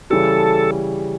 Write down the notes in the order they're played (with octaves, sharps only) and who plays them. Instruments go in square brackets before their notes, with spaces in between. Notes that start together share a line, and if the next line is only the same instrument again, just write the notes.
[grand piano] C#3 E3 G3 [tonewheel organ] A4